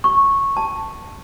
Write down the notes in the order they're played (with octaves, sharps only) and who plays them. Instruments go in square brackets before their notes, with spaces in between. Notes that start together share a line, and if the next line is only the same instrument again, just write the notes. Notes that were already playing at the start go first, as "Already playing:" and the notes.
[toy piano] C#6
A5